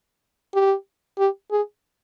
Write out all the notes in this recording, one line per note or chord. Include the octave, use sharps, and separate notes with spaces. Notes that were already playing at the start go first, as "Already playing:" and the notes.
G4
G4
G#4